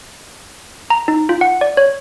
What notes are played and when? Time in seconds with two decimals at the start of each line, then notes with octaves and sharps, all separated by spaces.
0.90 A#5
1.08 D#4
1.29 F4
1.41 F#5
1.61 D5
1.77 C#5